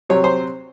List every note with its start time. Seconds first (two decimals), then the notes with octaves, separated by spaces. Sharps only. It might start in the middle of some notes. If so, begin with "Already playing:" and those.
0.09 C3 F#3 C4 C#5
0.24 C5